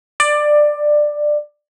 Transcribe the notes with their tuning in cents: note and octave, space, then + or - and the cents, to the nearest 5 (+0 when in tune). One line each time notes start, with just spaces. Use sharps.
D5 +15